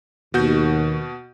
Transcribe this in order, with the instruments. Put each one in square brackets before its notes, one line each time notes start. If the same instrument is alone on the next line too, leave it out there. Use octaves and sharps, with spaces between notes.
[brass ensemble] D#2 [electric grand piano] B2 F#4 G6